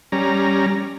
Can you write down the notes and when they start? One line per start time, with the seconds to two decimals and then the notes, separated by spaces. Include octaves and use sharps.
0.12 G3 C#4 A#5